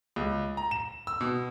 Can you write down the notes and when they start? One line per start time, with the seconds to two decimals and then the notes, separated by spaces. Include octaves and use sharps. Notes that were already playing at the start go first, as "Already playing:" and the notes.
0.16 C#2
0.57 A#5
0.71 E7
1.07 E6
1.21 B2